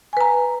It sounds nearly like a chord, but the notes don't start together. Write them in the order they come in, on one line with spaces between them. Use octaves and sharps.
G#5 B4 A#5